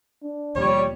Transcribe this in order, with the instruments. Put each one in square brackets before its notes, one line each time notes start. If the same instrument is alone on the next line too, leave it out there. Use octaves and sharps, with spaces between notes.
[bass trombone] D4
[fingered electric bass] D#2 B2 F3 [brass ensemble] G3 [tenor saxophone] C#5